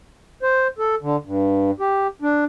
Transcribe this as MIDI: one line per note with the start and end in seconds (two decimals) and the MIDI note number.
0.43 0.67 72
0.79 0.95 69
1.02 1.16 50
1.25 1.71 43
1.80 2.07 67
2.22 2.44 62